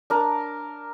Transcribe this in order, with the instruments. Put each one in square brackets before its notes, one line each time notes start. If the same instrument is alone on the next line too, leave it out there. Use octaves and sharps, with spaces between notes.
[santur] D4 A#4